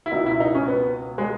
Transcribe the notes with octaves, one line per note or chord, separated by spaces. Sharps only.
E4
C#2 B2 D#4
E4
D#4
C#4
B3
G#3